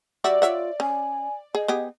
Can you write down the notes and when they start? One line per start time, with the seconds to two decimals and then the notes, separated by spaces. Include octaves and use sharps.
0.24 G3 F#4 D5 E5
0.42 F4 C#5 E5 F#5
0.80 C#4 G#5
1.55 G#4 D#5
1.68 B3 G4 G#4